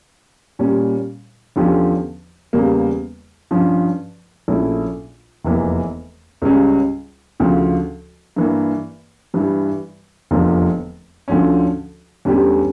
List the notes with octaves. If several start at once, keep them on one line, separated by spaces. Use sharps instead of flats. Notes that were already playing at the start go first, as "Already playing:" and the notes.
A#2 G3 C#4
E2 D3 F3 C#4 G4
E2 C#3 G3 A#3
G2 F3 C#4
A#1 A#2 A3 C#4 E4
F1 E2 E3 A#3
C#2 C#3 G3 C#4
D2 C#3 F3
G2 E3 A#3
G2 E3 G3
F1 E2 D3 F3 A#3
D2 D3 F3 C#4
E2 D3 G3 C#4 G4